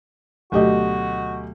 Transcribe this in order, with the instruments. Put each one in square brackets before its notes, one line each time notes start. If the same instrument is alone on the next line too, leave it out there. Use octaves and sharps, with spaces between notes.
[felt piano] D2 G4 D#5 [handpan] B2 F#3 [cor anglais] F#4